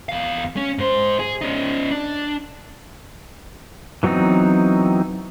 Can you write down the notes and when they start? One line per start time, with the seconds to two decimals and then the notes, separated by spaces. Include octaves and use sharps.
0.09 E2 F5
0.57 C#4
0.78 G#2 C5
1.19 G#4
1.41 C#4 D#4
1.91 D4
4.03 E3 F#3 B3 C4 D#4